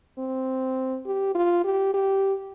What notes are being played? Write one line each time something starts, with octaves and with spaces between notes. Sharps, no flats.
C4
G4
F4
G4
G4